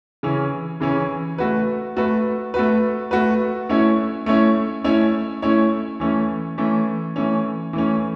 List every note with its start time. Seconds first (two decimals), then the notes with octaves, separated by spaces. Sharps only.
0.23 C#3 E3 C#4
0.81 C#3 E3 C#4
1.38 A3 F#4 B4
1.97 A3 F#4 B4
2.54 A3 F#4 B4
3.11 A3 F#4 B4
3.69 A3 C#4 E4 C#5
4.26 A3 C#4 E4 C#5
4.84 A3 C#4 E4 C#5
5.42 A3 C#4 E4 C#5
6.00 E3 A3 C#4
6.58 E3 A3 C#4
7.16 E3 A3 C#4
7.73 E3 A3 C#4